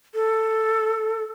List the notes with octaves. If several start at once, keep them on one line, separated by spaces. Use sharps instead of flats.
A4